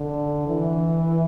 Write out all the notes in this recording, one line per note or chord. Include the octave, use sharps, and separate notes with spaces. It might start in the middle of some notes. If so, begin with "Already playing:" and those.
Already playing: D3
E3